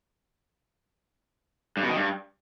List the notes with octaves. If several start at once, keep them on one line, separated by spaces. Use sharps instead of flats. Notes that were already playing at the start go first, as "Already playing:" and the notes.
G2
B2
D#3
G2